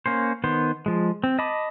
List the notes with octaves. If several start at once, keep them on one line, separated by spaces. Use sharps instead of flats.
A#3 C#4 C5
D#3 B3 C5
F3 G#3
C4
D#5 A5 B5 D6